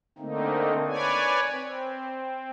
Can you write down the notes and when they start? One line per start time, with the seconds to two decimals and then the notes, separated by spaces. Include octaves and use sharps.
0.18 D3 A3 A#3 C4 D#4
0.87 B4 C#5 D5 G#5
1.51 C4